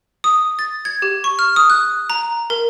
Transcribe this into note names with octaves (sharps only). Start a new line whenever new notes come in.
D#6
A6
G#6
G4
C#6
F6
D#6
F#6
A#5
A#4